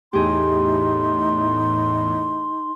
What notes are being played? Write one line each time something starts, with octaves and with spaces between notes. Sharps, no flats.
E2 A2 D#4 G4 G#4 C6